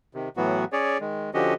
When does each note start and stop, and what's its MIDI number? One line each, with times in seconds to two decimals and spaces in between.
0.14 0.29 48
0.14 0.29 51
0.37 0.65 45
0.37 0.65 52
0.37 0.65 54
0.37 0.65 59
0.37 0.65 66
0.72 0.98 61
0.72 0.98 68
0.72 0.98 73
0.72 0.98 74
1.01 1.30 51
1.01 1.30 56
1.34 1.54 50
1.34 1.54 53
1.34 1.54 61
1.34 1.54 66
1.34 1.54 67
1.34 1.54 75